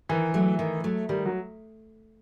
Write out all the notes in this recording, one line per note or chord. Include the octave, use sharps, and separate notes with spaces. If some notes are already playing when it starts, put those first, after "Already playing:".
D#3 E3
F#3 A3
D#3
F#3 A3
D#3 G3
F#3